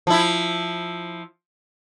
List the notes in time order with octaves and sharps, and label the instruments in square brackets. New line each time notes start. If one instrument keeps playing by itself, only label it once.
[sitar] F3 E4